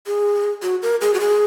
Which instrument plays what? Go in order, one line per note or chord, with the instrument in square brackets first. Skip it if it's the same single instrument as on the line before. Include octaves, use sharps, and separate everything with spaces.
[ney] G#4
F#4
A#4
G#4
F#4
G#4